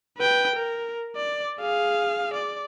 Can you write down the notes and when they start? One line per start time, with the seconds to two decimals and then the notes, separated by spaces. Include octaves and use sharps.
0.18 B4 G5
0.56 A#4
1.16 D5
1.61 G#4 F5
2.33 D5